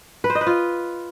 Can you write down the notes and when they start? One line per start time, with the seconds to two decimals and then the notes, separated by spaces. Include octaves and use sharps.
0.24 B4
0.30 C5
0.35 D#5
0.41 B4
0.47 F4